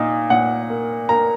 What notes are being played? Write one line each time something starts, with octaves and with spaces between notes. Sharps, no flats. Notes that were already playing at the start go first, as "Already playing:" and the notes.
Already playing: A#2 D#4
A#2 F#5
A#3
A#3 A#5